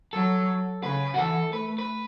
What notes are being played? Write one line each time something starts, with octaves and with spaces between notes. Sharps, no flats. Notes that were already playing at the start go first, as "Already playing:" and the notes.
F#3 A4
C#3 B4
F#4
E3 A4
A3 B4
B4